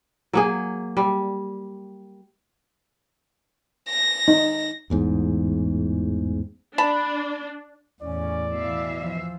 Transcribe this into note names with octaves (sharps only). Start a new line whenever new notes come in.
F#3 A#3 G#4
G3
A#6
D#4
A1 E2 G#2
D4 A5 B5
E2 A2 C#4 D5
B2 E3 E5 F5
F3